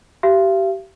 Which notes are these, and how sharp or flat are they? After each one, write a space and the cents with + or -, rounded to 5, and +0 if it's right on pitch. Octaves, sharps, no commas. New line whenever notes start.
G4 -25 F5 -45